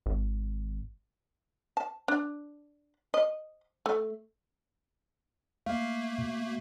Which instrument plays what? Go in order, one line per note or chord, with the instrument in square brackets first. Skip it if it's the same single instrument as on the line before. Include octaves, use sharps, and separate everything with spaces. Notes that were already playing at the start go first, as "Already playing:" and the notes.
[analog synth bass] G#1
[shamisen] A5
D4
D#5
A3
[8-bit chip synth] A3 A#3 [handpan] F5
[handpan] B2